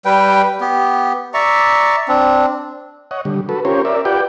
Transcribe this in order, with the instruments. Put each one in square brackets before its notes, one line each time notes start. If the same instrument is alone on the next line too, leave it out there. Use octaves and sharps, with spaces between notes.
[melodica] G3 B4 G5
B3 G4
D5 E5 A#5 C#6
C4 D4
[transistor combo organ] C#5 D#5 F#5
D3 G3
F#4 A4 B4
C#4 F4 G4 A#4 C5 C#5
A#4 D5 E5
F4 G4 B4 D5 F#5 G5